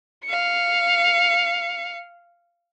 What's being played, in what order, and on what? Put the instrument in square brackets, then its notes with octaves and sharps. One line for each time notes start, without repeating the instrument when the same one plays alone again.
[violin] F5 C#7